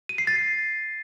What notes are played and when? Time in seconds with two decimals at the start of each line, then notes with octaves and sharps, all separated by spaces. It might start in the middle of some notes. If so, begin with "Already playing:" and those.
0.09 D#7
0.18 C7
0.27 A6